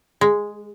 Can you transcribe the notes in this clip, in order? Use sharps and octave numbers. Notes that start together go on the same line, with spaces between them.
G#3